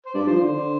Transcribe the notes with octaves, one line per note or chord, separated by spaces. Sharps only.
C5
G2 D5
F3 C5
D3 C5
D3